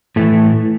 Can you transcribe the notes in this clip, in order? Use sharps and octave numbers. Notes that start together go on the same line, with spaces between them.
A2 E3 A3